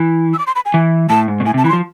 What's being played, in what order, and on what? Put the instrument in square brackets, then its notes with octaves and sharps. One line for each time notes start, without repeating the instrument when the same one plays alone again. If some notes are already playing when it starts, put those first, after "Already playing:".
Already playing: [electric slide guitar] E3
[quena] E6
D6
C6
B5
G#5
[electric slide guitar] E3
[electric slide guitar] A2 [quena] A5
[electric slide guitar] G#2
B2
[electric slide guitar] A2 [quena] G#5
[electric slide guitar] C3
[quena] A5
[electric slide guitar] E3 [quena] B5
[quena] C6
[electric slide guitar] F3